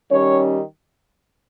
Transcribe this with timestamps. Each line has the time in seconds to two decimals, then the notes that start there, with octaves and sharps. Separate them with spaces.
0.11 D#3 G3 C#4 C#5